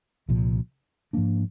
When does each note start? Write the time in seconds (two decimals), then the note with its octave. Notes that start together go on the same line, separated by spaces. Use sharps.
0.29 C2 A#2 F3
1.13 G#2 F3 A#3 D4